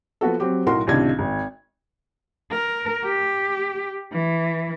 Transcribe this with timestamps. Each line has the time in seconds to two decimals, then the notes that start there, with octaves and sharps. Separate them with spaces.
0.21 F3 B3 F#4 A4
0.40 F#3 C4 G4
0.66 B1 A2 F#4 A#4 C6
0.87 C#2 A2 C3 D#3 D4 G#6
1.19 G#1
2.51 A#4
3.04 G4
4.12 E3